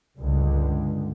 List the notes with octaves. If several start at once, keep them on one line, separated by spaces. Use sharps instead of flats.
C#2 G2 D3 G#3